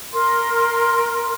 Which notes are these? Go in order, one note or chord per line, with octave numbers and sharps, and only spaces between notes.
A#4 C6